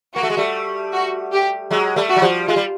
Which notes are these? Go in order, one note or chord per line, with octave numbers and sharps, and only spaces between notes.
A#3 F#4
A3
G#3
G3 A3
F#4
G4
F#3 G#3
G3 A3
F#4
F#3
F3 G3
G#3 F4
G3